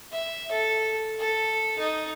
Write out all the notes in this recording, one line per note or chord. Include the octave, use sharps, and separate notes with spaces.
E5
A4
A4
D#4